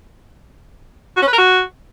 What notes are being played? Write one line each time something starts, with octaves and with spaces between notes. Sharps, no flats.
F#4
C#4
B4
A#4
F#4